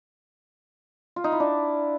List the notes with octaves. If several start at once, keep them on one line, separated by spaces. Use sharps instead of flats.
F4
D#4
E4
D4